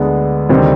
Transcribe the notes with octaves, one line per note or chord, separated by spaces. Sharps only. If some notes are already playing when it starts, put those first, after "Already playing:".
Already playing: D2 D3 G#3 B3
D2 C3 D#3 G3 C4